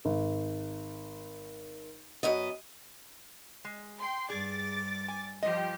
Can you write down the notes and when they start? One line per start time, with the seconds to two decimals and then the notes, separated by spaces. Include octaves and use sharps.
0.05 G#1
2.23 F#2 B3 D#5
3.65 G#3
3.99 G5 C6
4.29 G2 G#4 D5 D6 A6
5.08 G#5
5.43 F3 G3 G4 D#5